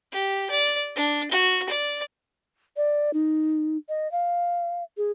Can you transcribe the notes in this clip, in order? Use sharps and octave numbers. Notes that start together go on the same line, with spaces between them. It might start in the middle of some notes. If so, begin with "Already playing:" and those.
G4
D5
D4
F#4
D5
D5
D#4
D#5
F5
G#4